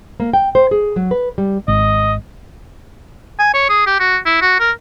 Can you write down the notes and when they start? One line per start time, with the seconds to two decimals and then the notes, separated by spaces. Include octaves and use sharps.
0.20 A#3
0.33 G5
0.55 C5
0.71 G#4
0.96 F#3
1.11 B4
1.38 G3
1.68 G#1 D#5
3.39 G#5
3.54 C#5
3.69 G#4
3.86 G4
4.00 F#4
4.26 E4
4.42 F#4
4.60 A#4